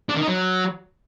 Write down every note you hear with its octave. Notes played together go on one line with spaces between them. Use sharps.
D4
D#3
D#4
F#3